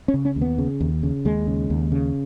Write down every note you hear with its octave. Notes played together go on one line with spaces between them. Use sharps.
C#4
C#3
C#4
D#2
B3
C#3
D#2
C#3
D#2 G#3
C#3
D#2
C#3